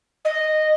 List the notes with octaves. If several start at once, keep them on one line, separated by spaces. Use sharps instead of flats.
D#5